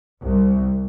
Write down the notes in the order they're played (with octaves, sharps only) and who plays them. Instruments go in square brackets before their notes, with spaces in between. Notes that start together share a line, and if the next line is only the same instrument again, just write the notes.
[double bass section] C2